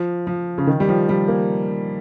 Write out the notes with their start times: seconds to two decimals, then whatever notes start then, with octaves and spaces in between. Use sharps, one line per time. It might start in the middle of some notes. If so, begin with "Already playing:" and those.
Already playing: F3
0.27 F3
0.58 C#3
0.67 D#3
0.80 G3
0.89 F3
1.09 G3
1.28 A#3